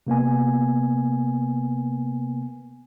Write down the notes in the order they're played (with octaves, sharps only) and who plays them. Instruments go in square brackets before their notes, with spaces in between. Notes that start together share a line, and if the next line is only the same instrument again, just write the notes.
[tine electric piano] C3 A#3 B3 G#5